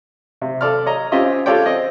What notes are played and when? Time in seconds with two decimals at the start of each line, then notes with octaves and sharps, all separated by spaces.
0.42 C3
0.61 A4 D5 F6
0.86 C#5 D#5 A#5
1.12 C4 C#4 F4 G4 D#5 E5
1.46 F4 G4 A4 C#5 D5 G5
1.66 C4 D#5